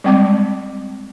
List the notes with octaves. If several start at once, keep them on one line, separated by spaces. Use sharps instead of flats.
G3 G#3 C4 A5 D6